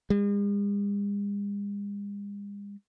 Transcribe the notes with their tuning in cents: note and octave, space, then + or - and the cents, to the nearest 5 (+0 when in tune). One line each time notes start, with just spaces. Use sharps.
G#3 -45